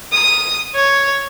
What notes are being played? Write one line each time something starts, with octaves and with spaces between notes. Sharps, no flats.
D#6
C#5